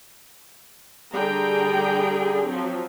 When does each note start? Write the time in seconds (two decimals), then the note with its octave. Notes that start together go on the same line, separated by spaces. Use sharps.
1.11 D3 G3 G#4 G5 A#5
2.47 F3 F#3 C4